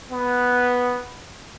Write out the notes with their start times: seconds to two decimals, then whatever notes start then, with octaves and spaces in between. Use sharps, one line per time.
0.11 B3